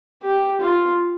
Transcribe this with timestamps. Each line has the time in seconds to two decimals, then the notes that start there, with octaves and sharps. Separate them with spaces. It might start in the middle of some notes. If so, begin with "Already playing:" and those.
0.23 G4
0.61 F4